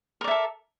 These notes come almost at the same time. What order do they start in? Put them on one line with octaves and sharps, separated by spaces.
A#4 D5 E5 A4